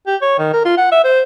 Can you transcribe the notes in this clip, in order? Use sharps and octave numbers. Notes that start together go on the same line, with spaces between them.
G4
C#5
D#3
A#4
F4
F#5
E5
C5